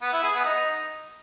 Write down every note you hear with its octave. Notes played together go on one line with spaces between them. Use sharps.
B3
E4
G#4
B3
D#4